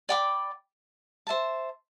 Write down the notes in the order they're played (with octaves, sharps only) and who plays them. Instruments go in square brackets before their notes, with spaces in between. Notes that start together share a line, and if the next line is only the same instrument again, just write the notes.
[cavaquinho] D5 G5 B5 D6
C5 E5 A5